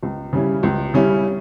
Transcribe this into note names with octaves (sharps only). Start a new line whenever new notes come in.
C#2
C#3 G3 C#4 E4
C#2
C#3 G3 C#4 E4